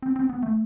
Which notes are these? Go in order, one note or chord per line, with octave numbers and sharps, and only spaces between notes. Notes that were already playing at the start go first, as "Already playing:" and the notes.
C4
C4
B3
A3